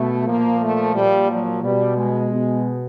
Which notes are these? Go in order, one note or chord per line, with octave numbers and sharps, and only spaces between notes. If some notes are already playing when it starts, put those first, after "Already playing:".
Already playing: B2 A3
A#2 F3 A#3
A3
A#2 F3 G3
F#3
B2 G3
G#3
B2